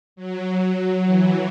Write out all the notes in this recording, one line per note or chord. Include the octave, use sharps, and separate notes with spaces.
F#3
E3